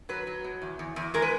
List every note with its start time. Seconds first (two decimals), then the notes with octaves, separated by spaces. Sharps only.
0.09 F#3 B4
0.27 F#3
0.44 B2
0.62 E2
0.79 E2
0.96 E2
1.14 G#3 A#4
1.22 B4